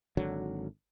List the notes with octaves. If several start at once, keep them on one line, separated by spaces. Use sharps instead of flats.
G#1 D3 F#3